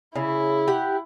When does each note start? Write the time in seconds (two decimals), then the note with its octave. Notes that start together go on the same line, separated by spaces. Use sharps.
0.16 C#3 E4
0.68 G4 F#5